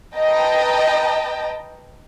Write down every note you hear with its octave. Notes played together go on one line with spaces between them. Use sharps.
B4 D#5 G5 A5 A#5